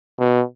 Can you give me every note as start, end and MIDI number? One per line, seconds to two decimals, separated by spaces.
0.19 0.42 47